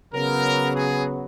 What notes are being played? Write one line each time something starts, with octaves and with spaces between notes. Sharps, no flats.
C#3 F#3 B3 A#4
G#4